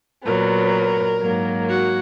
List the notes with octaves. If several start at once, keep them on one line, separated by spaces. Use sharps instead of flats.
A#2 F#3 B3 A#4
G#2 F#3 A#3
F#4